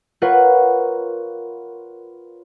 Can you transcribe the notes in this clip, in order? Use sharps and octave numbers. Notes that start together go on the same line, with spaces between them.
F4 A#4 B4 C#5 F#5